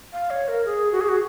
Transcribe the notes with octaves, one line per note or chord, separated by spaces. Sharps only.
F5
C#5
A#4
G#4
F#4
G#4
F#4